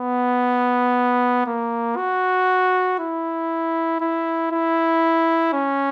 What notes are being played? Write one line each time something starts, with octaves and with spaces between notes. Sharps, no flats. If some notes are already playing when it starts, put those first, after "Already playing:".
Already playing: B3
A#3
F#4
E4
E4
E4
C#4